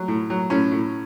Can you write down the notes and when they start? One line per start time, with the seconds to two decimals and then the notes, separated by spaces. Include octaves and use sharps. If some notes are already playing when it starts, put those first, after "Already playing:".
Already playing: F#3
0.08 A2
0.30 F#3
0.50 A2 C#4
0.72 A2